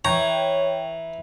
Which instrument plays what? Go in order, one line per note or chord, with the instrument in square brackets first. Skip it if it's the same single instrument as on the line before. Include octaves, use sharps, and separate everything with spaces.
[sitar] E3 [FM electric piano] C#5 G5 [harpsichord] A#5